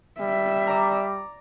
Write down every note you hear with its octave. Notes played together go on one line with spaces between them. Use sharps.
G3 E5
D5 A#5